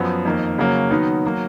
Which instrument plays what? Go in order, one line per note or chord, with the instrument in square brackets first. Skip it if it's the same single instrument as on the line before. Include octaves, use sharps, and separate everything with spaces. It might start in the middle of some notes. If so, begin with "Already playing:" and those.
Already playing: [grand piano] F#2 F3 B3
F2 D#3 A#3
C#3 F#3 A#3 C#4
D#3 F#3 B3 D#4
F#3 A#3